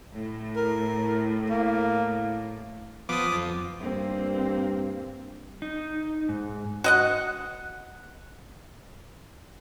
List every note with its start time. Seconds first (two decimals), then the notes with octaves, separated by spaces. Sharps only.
0.14 A2
0.56 A#4
1.50 A#3
3.09 F3 B3 D6 D#6
3.32 F2
3.81 G2 A#3 C4
5.62 D#4
6.29 G#2
6.84 F#4 D#5 F#5